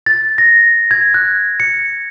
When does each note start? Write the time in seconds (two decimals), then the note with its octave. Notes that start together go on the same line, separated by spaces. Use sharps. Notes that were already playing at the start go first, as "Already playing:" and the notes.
0.06 A6
0.38 A#6
0.91 G#6
1.14 F#6
1.60 C#7